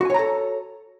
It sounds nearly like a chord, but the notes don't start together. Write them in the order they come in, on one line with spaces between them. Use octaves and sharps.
F#4 G#5 C#5 A#5 A4